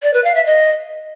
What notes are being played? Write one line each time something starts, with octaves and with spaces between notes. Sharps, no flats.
D5
B4
F5
E5
D#5